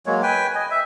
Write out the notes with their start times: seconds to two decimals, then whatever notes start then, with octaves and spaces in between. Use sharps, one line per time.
0.06 F#3 G#3 A#3 C#5
0.23 B4 G5 G#5
0.55 D#5 G#5
0.71 E5